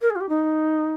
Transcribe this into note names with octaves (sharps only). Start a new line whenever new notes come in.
A#4
G#4
F4
G4
D#4